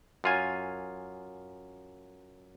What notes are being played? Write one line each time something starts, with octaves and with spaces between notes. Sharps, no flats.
F#2 F4 G#5